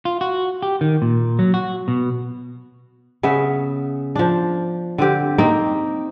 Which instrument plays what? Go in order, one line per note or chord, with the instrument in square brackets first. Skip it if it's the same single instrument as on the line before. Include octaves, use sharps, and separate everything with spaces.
[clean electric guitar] F4
F#4
G4
D#3
A#2
F#3
F#4
B2
[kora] C#3 B3 E5
F3 D4
D3 C4 G4
A#3 C4 D#4